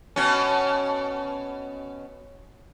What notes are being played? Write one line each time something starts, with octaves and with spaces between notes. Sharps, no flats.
B2 C#4